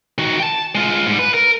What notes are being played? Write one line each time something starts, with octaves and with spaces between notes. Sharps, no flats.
D#3 F#4
G5 A5
G#3 F4
G#2 G3
B4
A#4